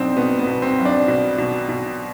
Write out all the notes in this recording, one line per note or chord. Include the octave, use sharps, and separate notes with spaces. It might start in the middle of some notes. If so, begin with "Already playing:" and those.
Already playing: B1 B2 C4 D4 D#4
B2 B3
B3
B2
C4
B1
D4
B2
B2
B2